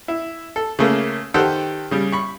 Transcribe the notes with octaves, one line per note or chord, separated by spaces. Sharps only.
E4
A4
C#3 A3 A#3
D#3 G4 A4 C5 F#5
C#3 G3
B5 C#6